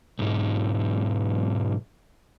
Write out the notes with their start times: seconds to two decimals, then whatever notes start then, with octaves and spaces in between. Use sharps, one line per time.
0.19 B1 G#2